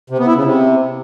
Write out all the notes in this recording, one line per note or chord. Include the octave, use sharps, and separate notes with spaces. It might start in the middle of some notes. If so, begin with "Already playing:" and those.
C3
B3
E4
C#3
C3